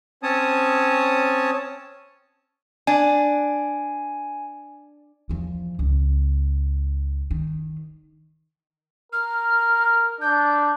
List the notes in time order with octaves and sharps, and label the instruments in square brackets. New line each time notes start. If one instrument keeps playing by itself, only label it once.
[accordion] C4 C#4 C#5 A5 D#6
[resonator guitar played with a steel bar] D4 [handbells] G#5
[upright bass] E2 F3
C#2
D#3
[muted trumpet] A#4 [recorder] F6
[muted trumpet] D4 [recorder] G6